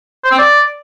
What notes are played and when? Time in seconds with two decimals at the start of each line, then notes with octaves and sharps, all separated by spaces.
0.24 C5
0.31 C4
0.38 D5